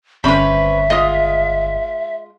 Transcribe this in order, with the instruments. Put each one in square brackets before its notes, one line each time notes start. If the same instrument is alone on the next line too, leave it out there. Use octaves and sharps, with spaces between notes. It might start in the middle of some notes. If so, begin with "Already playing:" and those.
[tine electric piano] G1 [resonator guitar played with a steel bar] C4 C#4 [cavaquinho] B4 B5 [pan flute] E5
[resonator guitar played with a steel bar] G#3 F4 [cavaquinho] D#5 D#6